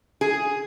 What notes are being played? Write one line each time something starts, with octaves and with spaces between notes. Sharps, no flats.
G#4